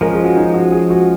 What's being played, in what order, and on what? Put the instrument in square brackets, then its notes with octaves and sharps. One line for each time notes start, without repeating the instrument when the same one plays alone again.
[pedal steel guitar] F3 G#3 C#4 [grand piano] A#4
[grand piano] G#4
F#4
D#4
F#4
G#4
F#4